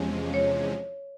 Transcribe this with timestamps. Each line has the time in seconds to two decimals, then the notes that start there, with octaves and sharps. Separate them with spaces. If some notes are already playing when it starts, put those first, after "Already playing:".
Already playing: E2 C3 F3 G#3 C#4
0.34 C#5